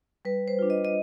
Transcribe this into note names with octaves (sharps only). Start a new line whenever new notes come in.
G3 B4
C5
D4 F4
D#5
D#5